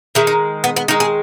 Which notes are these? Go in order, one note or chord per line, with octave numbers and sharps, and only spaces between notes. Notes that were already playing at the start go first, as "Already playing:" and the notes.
D#3 G#3 E4
D#4
B3
B3
D#3 G#3 D#4
G#4